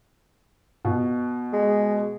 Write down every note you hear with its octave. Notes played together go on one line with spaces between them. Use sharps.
B2
G#3